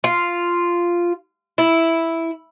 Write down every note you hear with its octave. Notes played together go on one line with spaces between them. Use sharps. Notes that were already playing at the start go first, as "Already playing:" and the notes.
F4
E4